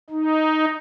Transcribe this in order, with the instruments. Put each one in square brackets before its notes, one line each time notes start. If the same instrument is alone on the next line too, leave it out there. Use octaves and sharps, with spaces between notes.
[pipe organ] D#4